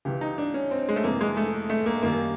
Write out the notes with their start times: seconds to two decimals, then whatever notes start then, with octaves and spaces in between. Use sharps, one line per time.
0.05 C#2 C#3 E3 G4
0.21 D#4
0.38 D4
0.54 C#4
0.71 C4
0.89 G#3
0.96 A3
1.03 F2 C3 E3 A#3
1.21 G#3
1.37 A3
1.70 A3
1.86 A#3
2.03 F#2 D#3 G3 A#3